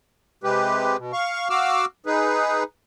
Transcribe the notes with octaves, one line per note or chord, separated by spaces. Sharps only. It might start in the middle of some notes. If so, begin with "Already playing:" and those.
C3 G#3 G4 B4
B2
F5 C#6
F#4 F5 D6 E6 F6
D#4 G#4 B4